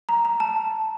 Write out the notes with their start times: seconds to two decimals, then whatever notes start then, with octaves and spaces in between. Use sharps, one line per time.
0.09 A#5
0.25 A#5
0.40 A5